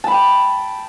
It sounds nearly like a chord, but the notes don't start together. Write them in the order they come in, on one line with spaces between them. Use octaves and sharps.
A5 B5 G5